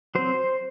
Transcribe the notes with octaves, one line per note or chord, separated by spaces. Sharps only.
F#3 C4 C5